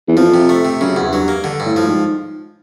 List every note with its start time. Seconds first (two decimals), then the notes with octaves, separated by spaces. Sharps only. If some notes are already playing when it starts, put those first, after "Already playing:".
0.08 E2
0.17 F2 F3
0.34 C3
0.49 A3
0.65 C3
0.81 F#2 C#3
0.96 E2
1.13 G2 F#3
1.28 A#3
1.44 D3
1.60 G2
1.66 A2
1.76 F3
1.87 G#2